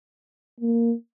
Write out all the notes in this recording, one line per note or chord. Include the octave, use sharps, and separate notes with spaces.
A#3